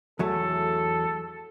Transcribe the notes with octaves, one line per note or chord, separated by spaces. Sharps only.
E2 F#3 A3 A4